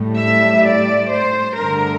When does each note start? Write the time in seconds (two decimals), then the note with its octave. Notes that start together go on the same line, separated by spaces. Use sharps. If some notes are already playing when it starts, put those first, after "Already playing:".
Already playing: A2 G3
0.19 E5
0.65 D5
1.12 C5
1.58 G2 D3 A3 A#4